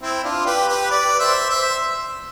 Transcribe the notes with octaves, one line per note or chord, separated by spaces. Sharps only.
C4 E4
D4 F4
G4 B4
G4 B4
B4 D5
C5 E5
C5 E5